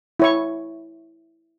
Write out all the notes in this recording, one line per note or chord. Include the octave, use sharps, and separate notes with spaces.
E4 C#5 C#6